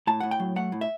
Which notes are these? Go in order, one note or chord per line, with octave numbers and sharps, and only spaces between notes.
A2 A5
A2 F#5
G5
F#3
A3 F#5
A2
E5